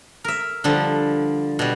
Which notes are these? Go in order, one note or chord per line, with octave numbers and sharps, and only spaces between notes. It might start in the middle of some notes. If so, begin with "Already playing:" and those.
A#4 E5
D3 F3 G3
B2 G3